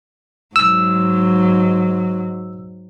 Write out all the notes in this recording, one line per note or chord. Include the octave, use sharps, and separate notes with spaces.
G#2 F#3 E6